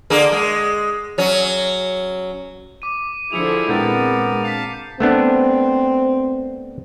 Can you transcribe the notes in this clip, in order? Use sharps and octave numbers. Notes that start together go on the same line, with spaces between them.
D3 A#3 G#4
G#3
F#3 C#4
D6 D#7
D3 F3 E4 G#4 C#7 F7
A#2 G#3 B3 C4 D4 A#4 G6 A6
F5 A5 B6 C7 F7
A3 B3 C4 D4